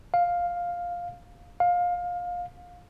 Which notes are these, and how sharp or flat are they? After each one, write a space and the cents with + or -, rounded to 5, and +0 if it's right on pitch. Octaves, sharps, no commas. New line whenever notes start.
F5 +5
F5 +20